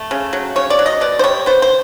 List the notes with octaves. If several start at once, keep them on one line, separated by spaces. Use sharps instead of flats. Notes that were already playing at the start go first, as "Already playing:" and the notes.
Already playing: A3
C#3
F#3
C#3 C#5
D5
F#3
D#5
B2 D5
C5
G3 C#5
B3 C5
C5